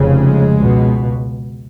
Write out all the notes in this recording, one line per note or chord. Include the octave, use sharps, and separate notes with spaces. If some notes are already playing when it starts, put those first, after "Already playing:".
Already playing: F1 F2 C#3
G#3
C#2 B2